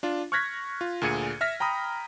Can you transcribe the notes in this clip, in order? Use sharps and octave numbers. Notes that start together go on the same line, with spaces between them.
D4 F4
C#6 F6 F#6 G#6 A#6 B6
F4
D2 A#2 G#4 G#6 C#7 D#7
E5 F6 A#6 B6
G5 A#5 B5 D#6